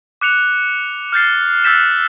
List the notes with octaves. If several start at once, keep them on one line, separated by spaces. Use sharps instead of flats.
D6 F#6 C#7 F7
F6 G6 A6 C7
E6 F#6 G6 A6 B6 E7